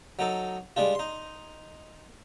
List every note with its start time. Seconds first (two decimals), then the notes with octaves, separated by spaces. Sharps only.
0.19 F#3 D#4 A4
0.76 G3 G#3 D4 F4
0.95 D#4 C6